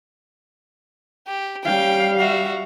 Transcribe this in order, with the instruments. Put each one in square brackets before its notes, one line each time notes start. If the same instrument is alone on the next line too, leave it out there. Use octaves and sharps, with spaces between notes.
[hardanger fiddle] G4
[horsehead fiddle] G3 F5 [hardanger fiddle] C#4 G5
[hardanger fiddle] F#4 E5